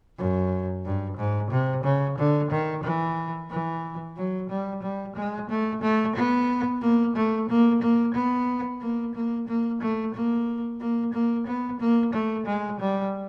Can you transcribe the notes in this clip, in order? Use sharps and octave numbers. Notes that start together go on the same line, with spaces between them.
F#2
G2
G#2
C3
C#3
D3
D#3
E3
E3
F#3
G3
G3
G#3
A3
A3
B3
A#3
A3
A#3
A#3
B3
A#3
A#3
A#3
A3
A#3
A#3
A#3
B3
A#3
A3
G#3
G3